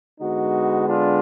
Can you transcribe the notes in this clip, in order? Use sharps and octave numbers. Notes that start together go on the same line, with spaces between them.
D3 G#3 B3 D#4 F#4
D4 F4